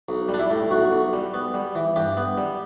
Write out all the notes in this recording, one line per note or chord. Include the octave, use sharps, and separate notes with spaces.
B1
G3
D4
E4
A2
B1 F#4
B1
G3
B3
G3
E3
G2 G4
B3
G3